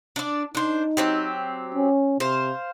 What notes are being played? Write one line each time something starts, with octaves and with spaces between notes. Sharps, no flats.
D4 D5
D4 D#4 C5
F#3 C4 G4
C#4
C3 C5 F5